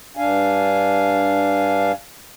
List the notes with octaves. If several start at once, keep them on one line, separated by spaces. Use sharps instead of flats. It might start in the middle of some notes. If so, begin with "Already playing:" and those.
G2 D4 F5 G#5